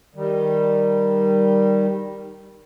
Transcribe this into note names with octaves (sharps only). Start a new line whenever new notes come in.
D#3 G3